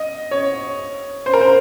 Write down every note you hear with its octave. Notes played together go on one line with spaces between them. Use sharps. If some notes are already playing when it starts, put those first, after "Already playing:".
Already playing: D#5
C#5
C5
A#4
C5